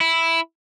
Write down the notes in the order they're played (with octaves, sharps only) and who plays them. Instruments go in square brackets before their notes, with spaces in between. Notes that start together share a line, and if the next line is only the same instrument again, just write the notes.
[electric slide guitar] E4